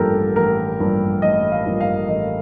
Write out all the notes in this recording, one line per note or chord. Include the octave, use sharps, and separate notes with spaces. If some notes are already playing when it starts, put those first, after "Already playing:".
Already playing: A1 G2 F3 A#3 G4 A4 A#4
A1 A#4
G2 F3 A#3
A1 D#5
F5
G2 F3 A#3
F5
A1 D#5